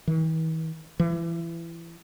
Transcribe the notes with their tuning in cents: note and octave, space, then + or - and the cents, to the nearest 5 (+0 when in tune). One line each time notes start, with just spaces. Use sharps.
E3 -45
E3 +25